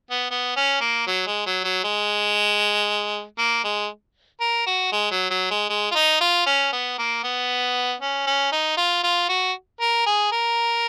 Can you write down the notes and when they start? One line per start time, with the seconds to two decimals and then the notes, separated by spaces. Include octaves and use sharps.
0.11 B3
0.31 B3
0.56 C#4
0.81 A#3
1.07 F#3
1.27 G#3
1.46 F#3
1.64 F#3
1.84 G#3
3.39 A#3
3.64 G#3
4.41 A#4
4.67 F#4
4.92 G#3
5.11 F#3
5.30 F#3
5.51 G#3
5.70 G#3
5.91 F4
5.95 D#4
6.21 F4
6.46 C#4
6.73 B3
6.98 A#3
7.24 B3
8.01 C#4
8.27 C#4
8.52 D#4
8.77 F4
9.03 F4
9.29 F#4
9.81 A#4
10.06 G#4
10.32 A#4